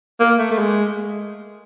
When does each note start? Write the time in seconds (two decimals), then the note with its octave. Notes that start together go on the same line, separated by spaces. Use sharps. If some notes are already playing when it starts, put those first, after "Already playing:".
0.20 A#3
0.39 A3
0.51 A3
0.59 G#3